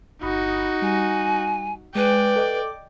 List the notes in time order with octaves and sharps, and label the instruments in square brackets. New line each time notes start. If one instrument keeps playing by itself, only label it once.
[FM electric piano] G1 B5 D#6 [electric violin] D#4 F#4
[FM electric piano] G3 [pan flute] G#5
[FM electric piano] G#3 G#5 [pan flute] B4 [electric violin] D5 G5
[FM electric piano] A4 D#5 D6